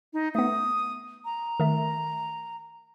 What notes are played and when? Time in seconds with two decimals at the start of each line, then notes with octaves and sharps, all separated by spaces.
0.13 D#4
0.35 A3 B3 D#6
1.25 A#5
1.60 D#3 A3